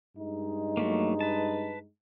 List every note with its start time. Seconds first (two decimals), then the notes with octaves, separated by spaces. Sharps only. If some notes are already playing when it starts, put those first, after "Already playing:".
0.16 G2 G#3 D#4
0.77 F#3 A3 A#3
1.21 B4 A5